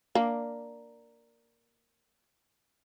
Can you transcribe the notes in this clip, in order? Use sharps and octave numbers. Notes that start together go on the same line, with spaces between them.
A#3 D4